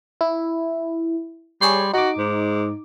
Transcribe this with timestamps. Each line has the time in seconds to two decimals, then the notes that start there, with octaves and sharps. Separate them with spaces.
0.21 E4
1.61 G3 G#4 C#5 C6
1.94 D#4 F#4 D6
2.18 G#2